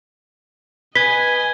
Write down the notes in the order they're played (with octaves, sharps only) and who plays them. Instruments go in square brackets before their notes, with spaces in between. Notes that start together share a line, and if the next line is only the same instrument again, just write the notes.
[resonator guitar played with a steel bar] B4 [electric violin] D#5 G#5 [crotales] G#6 G7 [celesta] B6